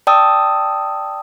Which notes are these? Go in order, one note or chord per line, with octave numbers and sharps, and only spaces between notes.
D5 G5 A5 D#6 E6